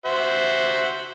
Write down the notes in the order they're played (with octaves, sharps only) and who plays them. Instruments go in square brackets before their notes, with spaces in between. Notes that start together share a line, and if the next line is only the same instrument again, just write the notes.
[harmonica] F#4 C5 E5